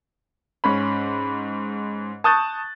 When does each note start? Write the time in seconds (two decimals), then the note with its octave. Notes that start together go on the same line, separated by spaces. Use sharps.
0.64 G#2 C#4 B5
2.24 A5 C#6 D#6 F#6 G6 A6